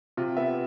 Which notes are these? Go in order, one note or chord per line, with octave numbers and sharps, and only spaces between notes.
C3 F4
B3 E5